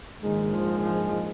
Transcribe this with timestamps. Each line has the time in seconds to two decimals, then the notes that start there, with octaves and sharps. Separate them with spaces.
0.21 A#1 G#2 D#3 G#3
0.53 F3
0.83 F3